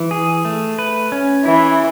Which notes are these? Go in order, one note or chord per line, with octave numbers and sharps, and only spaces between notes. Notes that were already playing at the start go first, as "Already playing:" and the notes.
Already playing: E3
G#4
A3
B4
C#4
E3 E4